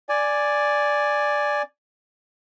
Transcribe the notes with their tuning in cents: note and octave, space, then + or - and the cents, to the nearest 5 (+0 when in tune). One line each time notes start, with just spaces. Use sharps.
D5 +0 G#5 +0